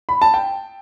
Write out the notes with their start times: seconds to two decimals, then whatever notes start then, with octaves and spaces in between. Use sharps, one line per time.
0.09 B5
0.22 A5
0.34 G5